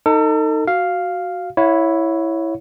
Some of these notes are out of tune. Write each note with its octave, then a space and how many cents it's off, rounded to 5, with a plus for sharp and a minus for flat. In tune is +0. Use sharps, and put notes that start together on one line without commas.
D#4 +0 A4 +35
F#4 +0 F5 +0
E4 +0 C#5 +0 F#5 -40